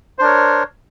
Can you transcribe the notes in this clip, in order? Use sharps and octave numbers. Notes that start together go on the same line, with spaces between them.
D4 A#4 C5 C#5